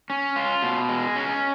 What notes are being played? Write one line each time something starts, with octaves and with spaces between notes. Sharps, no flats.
C#4
F4
B2
G#3
C#4